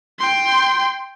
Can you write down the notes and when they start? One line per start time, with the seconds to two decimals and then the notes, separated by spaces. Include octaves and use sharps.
0.19 G5 C6